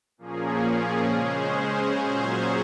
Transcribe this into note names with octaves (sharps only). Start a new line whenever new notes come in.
A#2 F3 A#3 C#4 G#4
C#3 G#3 C#4 G#4 C5
A#2 F#3 C#4 G#4 C5